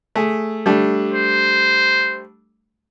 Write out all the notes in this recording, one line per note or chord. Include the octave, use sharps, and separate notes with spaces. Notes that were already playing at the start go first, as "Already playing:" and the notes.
A3 G#4
G3 A3 D4
C5